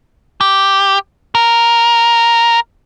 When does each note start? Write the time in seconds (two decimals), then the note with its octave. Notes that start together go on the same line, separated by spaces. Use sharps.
0.41 G4
1.35 A#4